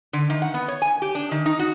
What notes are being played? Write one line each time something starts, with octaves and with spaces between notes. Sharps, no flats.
D3
D#3
F#5
B3
C#5
G#5
G4
D4
D#3
D#4
F#4